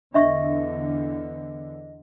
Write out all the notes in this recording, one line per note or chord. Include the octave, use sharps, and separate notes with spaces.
E2 D3 D4 D#5 E5 C#6 A#6